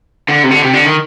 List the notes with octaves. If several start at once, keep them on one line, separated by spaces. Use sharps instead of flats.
D3
C3
D3
C3
D3
D#3